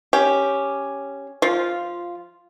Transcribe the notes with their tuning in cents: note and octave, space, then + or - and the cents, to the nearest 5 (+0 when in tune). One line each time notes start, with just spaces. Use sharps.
C#4 +0 G4 +0
F3 +0 F4 -5